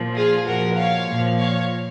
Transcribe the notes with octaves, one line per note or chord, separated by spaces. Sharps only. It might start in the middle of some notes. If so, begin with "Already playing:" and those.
Already playing: A#2 F3
F4 G#4
A#2 F3 F#4 A#4
C#5 F5
A#2 F3
C#5 F5